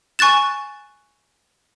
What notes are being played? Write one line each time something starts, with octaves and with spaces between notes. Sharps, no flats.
G#5 C#6 F#6 A6 E7